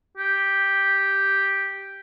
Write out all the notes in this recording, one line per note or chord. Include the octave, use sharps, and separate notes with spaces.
G4